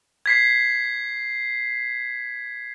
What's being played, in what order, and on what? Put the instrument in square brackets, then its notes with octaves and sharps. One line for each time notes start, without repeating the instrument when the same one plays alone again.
[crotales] G#6 B6 C7